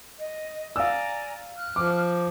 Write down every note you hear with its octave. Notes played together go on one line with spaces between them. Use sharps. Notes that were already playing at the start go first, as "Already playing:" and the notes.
D#5
D5 F5 G#5 A#5 E6
F6 F#6
F3 D6